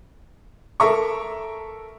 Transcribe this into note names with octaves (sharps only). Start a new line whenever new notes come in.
A4 A#4 E5 A#5 C#6